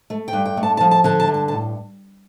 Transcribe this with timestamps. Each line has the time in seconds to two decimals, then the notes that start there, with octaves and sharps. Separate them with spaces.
0.10 A3
0.28 G5
0.33 G2
0.46 G5
0.57 A3
0.63 A5
0.77 A5
0.81 F3
0.91 A5
1.04 D3 A5
1.20 A5
1.28 G2
1.34 A5
1.48 A5
1.51 A2